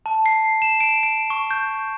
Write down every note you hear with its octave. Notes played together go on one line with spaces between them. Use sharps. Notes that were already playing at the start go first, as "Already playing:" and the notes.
A5
C7
E7
D7
D7
C#6
G6